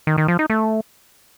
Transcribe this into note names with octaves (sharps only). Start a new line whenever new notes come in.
D#3
D#3
F3
D#4
A3